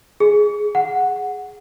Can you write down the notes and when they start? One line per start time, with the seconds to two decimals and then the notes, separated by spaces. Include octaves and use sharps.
0.20 G#4
0.75 F#5